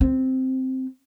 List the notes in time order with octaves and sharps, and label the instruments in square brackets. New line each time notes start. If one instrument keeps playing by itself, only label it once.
[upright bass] C4